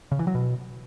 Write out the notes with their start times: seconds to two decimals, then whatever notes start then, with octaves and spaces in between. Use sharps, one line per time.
0.12 C#3
0.19 E3
0.27 F#3
0.35 B2